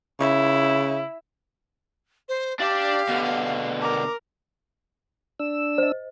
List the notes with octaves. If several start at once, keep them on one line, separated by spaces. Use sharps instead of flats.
C#3 E4
C5
D4 G4 D5 F5
B2 D3
A#4 D6
D4 E6
C5 D#5